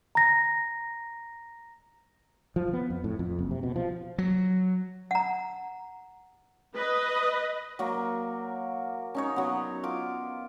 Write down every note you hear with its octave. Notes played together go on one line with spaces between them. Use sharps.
A#5 A#6
F3
B3
F2
A2
F2
F#1
C3
B2
F3
F#3
F#5 A#5
B4 D#5
F#3 A#3 F#4
C#4 D#4 C#5
F#3 B3
F4 D6